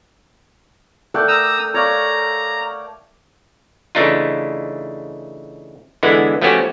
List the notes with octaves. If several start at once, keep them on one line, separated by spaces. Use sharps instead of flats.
A3 A#4 D5 F#5 G5 G6
A#5 D#6 E6
C#5 D5 F5 A#5
C#3 E3 A3 D4 D#4 F4
D3 E3 G#3 B3 E4
F3 A3 B3 C#4 F#4 G4